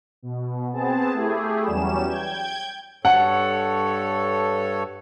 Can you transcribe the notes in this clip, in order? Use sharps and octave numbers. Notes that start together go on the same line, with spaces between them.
B2
B3 C4 G#4 A5
A3 E4 G4 G#4
E2 F#3 G3 C#4 E7
G5 G6 G#6
G2 A4 C#5 F#5